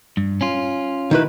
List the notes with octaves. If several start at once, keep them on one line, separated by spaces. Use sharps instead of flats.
G2
C#4 F4
D#3 E4 B4